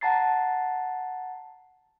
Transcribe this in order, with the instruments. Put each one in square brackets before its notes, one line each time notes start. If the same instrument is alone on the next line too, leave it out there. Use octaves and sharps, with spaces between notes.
[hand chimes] F#5 A5 A#5 A6 C7